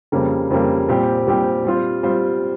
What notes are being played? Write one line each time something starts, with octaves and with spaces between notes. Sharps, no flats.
F2 C#3 G3 A#3
F2 C#3 G3 A#3
A#2 G3 C4 G4
A#2 G3 C4 G4
G3 C4 F4 C5
G3 C4 F4 C5